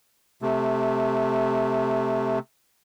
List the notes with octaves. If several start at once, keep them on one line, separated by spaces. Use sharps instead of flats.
C3 A3